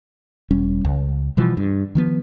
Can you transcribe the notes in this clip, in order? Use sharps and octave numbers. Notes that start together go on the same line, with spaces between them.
E1 G3 C#4
C#2
B2 E3 F3 G3
G2
D#3 F3 B3